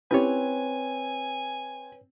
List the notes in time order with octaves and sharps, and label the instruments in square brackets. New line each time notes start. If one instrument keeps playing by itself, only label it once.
[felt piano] C4 [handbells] C#4 E4 G4 [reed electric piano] B4 C#5 [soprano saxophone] G#5